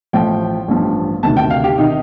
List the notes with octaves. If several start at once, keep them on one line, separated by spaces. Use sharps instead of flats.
A1 A2 F3 G5
A1 G2 F3
D2 C3 D#3 A5
G5
F5
G4
C3 D#3 D#4